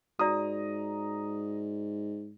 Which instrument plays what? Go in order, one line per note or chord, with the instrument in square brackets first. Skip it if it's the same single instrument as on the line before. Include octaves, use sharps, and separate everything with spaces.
[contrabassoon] G#2 [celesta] F#4 D5 [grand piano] A#5 D#6